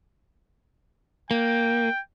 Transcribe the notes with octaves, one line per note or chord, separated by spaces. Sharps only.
A#3 G5